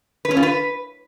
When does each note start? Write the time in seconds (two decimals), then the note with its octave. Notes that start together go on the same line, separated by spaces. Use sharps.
0.25 B4
0.31 C#4
0.37 F4
0.43 B4